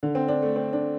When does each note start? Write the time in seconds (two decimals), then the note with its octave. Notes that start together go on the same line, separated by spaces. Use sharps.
0.03 D3
0.15 C4
0.28 D4
0.42 A3
0.56 C4
0.73 D4